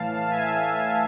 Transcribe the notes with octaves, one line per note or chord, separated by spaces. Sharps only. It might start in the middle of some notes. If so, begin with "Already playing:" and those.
Already playing: A2 E3 F5 A5
E5 G#5